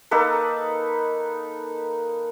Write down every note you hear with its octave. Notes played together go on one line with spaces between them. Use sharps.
A#3 D#4 A4 B4